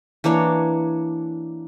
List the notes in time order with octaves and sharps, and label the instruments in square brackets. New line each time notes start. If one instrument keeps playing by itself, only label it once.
[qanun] E3 A#3 D4 C#5